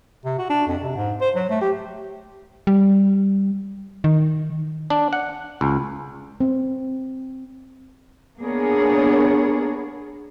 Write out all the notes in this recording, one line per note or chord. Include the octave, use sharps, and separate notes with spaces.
C3
F#4
D4
F2
C3
G#2
C5
F#3
A3
G4
G3
D#3
D4
F#5
C#2
C4
A#3 B3 D4 G#4 A#4 C#5